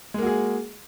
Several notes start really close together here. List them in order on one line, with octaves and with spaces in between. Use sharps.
G#3 A#3 F#4 G#4